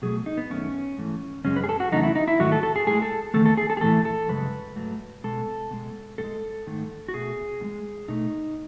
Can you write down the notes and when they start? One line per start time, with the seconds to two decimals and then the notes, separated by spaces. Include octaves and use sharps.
0.02 B2 F#3 A3 G#4
0.26 D#4
0.37 B3
0.50 F#2 D#3 A3 C#4
0.97 G#2 E3 A3
1.44 F#2 C#3 G#3 C#4
1.56 B4
1.64 G#4
1.69 A4
1.80 F#4
1.92 E2 C#3 F#3 A3 D#4
2.03 E4
2.16 D#4
2.28 E4
2.40 G#2 D#3 F#3 A3 F#4
2.52 A4
2.63 A4
2.76 G#4
2.87 A2 G#3 G#4
3.02 A4
3.34 E2 D#3 A3 A4
3.46 A4
3.57 G#4
3.70 A4
3.77 G#4
3.81 A2 E3 A3 A4
4.05 A4
4.29 F#2 C#3 G#3 B4
4.76 G#2 F#3 A3
5.24 B2 G#3 A4
5.71 B2 G#3
6.18 A2 A4
6.24 G#3
6.67 G#2 D#3 A3
7.08 F#4
7.14 B2 A3 G#4
7.61 A2
7.64 G#3
8.08 B2 A3 D#4